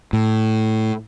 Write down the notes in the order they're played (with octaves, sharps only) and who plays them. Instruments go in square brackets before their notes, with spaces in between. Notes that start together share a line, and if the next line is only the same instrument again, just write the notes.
[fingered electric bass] A2